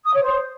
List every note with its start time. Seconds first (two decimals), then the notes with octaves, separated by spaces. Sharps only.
0.05 D#6
0.14 C#5
0.22 C5